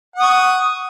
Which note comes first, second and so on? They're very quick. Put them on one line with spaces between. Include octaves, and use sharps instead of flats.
F#5 D#6 C#6